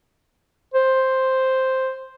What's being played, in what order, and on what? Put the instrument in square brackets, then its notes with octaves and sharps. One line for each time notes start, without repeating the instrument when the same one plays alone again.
[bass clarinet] C5